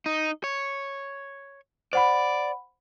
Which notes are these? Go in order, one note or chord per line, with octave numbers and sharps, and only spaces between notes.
D#4
C#5
C5 D5 F#5 B5